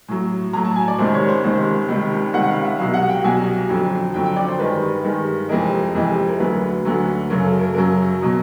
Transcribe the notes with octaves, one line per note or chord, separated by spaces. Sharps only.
A2 F#3
A2 F#3 A#5
A5
G#5
D5
C#2 C3 D#3 C5
C#5
C5
C#2 C3 D#3 C5
C#2 C3 D#3 G3
C#2 C3 D#3 G3 F#5
F5
E5
C2 B2 F#3 F5
F#5
G5
C2 B2 F#3 G#5
F2 D3 F#3
F2 D3 F#3 G5
G5
D5
C5
G2 D#3 G#3 B4
G2 D#3 G#3
F2 C3 E3 G#3 A#4
F2 C3 E3 G#3
A#4
D2 D3 F#3 B4
D2 D3 F#3
F#2 C#3 F#3 A#4
A4
A#4
F#2 C#3 F#3 A#4
B2 F#3